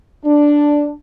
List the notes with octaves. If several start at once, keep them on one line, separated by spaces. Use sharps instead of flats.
D4